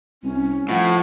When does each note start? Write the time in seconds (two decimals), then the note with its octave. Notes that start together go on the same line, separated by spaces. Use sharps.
0.23 C2 C#4
0.69 A2 F3 F#5